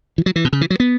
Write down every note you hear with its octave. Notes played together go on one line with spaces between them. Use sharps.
E3
F#3
E3
B2
C#3
E3
F#3
B3